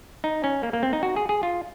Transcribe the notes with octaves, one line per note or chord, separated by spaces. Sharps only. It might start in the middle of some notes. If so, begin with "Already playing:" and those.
D#4
C#4
A#3
A#3
C4
D#4
F#4
G#4
G#4
F4